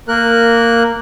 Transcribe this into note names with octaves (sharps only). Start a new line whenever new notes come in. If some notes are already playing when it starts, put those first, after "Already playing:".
A#3 A#4 F#6